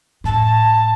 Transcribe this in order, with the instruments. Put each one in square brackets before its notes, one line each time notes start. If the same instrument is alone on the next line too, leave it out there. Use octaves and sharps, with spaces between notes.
[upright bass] A2 [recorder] A5